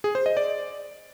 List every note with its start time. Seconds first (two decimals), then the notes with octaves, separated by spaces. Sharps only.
0.04 G#4
0.15 C5
0.26 D#5
0.37 D5